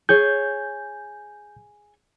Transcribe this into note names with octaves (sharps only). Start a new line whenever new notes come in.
G#4 C#5 G6